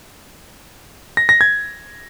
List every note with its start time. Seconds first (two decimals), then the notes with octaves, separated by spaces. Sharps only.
1.17 A#6
1.29 A#6
1.41 G#6